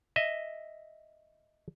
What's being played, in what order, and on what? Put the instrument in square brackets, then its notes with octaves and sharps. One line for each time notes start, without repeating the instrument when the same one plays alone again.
[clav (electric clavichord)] D#5 E5